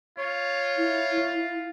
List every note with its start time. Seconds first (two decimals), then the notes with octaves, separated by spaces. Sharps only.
0.18 F4 C#5
0.77 E4